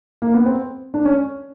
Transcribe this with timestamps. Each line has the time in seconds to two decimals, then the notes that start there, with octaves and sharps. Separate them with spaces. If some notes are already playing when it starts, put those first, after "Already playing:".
0.22 A#3
0.34 B3
0.46 C4
0.94 D4
1.05 C#4